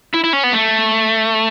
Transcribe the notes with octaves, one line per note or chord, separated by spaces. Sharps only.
E4
E4
C#4
B3
A3